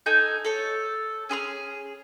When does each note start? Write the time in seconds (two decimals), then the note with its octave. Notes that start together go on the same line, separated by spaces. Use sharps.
0.06 D#4 A4 G#5 G6
0.45 A4 C#5
1.29 C#4 G#4 C6 F6